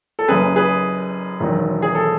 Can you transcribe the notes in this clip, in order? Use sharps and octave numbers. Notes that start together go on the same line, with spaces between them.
A4
F#1 F#2 C#3 G#4 B4
G#4 B4
E1 E2 D#3 F#3
G#4
A4